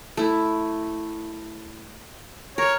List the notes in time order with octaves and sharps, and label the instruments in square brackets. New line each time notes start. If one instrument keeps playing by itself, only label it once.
[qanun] A3 E4
[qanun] A#4 [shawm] C#5